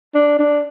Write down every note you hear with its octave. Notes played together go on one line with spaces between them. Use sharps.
D4
D4